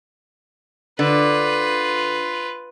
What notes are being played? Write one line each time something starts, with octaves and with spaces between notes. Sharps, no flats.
D3 F4 B4